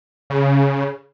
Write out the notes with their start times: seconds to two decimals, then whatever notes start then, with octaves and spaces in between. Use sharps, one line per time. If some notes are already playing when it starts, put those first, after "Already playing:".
0.30 C#3